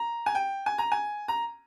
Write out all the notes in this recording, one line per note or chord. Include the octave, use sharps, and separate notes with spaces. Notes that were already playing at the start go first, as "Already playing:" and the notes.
Already playing: A#5
G#5
G5
G#5
A#5
G#5
A#5